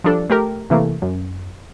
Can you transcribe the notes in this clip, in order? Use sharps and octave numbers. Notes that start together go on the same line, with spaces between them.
F3 G3 D4 A4
A3 G4 A#4
C3 E3 A3 A#3
F#2